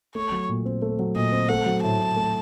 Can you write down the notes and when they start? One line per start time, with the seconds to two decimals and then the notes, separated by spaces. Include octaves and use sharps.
0.15 A3 C#5
0.32 F#3
0.49 A#2
0.65 C4
0.82 A3
0.99 F#3
1.15 A#2 D#5
1.32 C4
1.49 A3 F#5
1.66 F#3
1.82 A2 A5
2.00 A2
2.16 A3